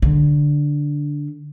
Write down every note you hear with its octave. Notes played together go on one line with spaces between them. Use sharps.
D3